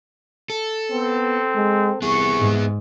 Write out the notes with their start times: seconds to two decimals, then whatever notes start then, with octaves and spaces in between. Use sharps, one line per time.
0.50 A4
0.91 B3 C4
1.55 G#3
2.02 C2 B3 G#4 C#6
2.39 G#2